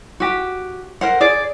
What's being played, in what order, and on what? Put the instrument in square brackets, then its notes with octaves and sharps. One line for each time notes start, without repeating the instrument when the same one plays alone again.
[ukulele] F#4 G4
A#4 C5 F#5
G#4 D5